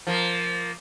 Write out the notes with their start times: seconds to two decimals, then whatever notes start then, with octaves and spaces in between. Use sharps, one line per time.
0.07 F3 A#3